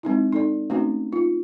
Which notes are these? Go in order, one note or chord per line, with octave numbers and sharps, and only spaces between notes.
G#3 C4 D#4 E4
D#4 A4 D5
A3 C4 C#4 D#4 F#4
D#4 F4